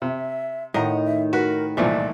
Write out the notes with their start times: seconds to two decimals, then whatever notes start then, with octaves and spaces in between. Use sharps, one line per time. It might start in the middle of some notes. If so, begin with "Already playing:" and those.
0.02 C3 E5
0.74 A2 D#3 D#5 F#5 A#5
1.05 E5
1.33 F#4 A#4 B4
1.77 C2 A#2 E3 F3 A3 D5